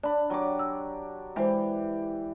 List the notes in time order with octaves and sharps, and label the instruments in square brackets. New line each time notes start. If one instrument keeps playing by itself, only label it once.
[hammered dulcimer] D4 B5 [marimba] D5
[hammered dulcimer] F#3 G4 D6
[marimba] E6
[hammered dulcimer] E3 G4 [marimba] G#3 C5